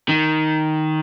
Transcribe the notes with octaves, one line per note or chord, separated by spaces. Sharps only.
D#3